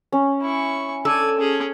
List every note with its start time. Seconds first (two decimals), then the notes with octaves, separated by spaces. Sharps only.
0.12 C#4
0.42 E4 C#6
1.05 A4 D5 G#5
1.38 C#4 G#4